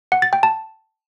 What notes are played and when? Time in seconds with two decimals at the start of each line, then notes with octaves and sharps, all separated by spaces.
0.12 F#5
0.22 A6
0.33 G5
0.43 A5